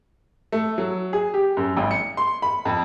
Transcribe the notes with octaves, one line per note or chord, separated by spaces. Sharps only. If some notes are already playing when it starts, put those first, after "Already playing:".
A3
F#3
G#4
G4
F#2
G#1
C#7
C6
B5
F2